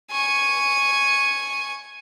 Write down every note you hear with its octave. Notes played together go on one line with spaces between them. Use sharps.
G#5 C#6